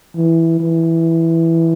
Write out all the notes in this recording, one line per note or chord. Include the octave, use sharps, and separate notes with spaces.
E3
E3